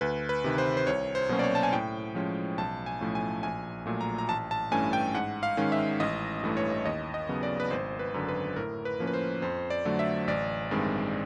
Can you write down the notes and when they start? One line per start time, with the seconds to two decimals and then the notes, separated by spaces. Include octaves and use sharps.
0.01 D2 B4
0.29 B4
0.44 C3 D#3
0.58 C5
0.77 C5
0.87 C2 C#5
1.15 C5
1.29 B2 F#3 A#3 C#4
1.39 D5
1.43 C#5
1.55 A5
1.63 G#5
1.73 A2 G5
2.15 F3 G#3 C#4
2.58 B1 A5
2.86 G#5
3.01 A2 F3 A3 C#4
3.15 G#5
3.43 A#1 G#5
3.86 A#2 F#3 A3
4.01 A#5
4.18 A#5
4.29 A1 A5
4.51 A5
4.71 G2 E3 A3 C#4 G#5
4.93 G5
5.14 G#2 F#5
5.43 F5
5.57 D#3 G#3 C#4
5.72 E5
6.00 A1 D#5
6.43 G2 E3 A3
6.57 C#5
6.85 D#2 D#5
7.14 D#5
7.29 C#3 F#3 B3
7.43 D5
7.60 B4
7.71 G#1 C5
7.99 B4
8.14 F#2 D3
8.28 B4
8.56 A2 A#4
8.85 B4
9.00 F3 A#3 C#4
9.07 B4
9.14 C5
9.42 F2 C5
9.70 D5
9.85 D3 F#3 A3
9.99 E5
10.27 A1 D5
10.71 G2 D#3 G#3 C4